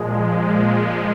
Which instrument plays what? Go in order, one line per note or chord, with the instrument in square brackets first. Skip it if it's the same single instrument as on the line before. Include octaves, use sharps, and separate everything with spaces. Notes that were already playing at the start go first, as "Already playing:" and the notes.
Already playing: [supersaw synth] A#2 F3 G#3